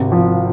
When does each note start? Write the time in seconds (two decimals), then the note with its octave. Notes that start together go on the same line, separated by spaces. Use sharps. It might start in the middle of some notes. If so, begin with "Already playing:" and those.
Already playing: G#1 C3
0.12 F3